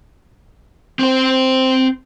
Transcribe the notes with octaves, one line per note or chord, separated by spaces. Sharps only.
C4 C5